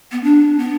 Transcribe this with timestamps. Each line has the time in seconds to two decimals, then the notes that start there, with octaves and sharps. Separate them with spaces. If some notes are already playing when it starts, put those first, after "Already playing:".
0.12 B3
0.24 D4
0.59 B3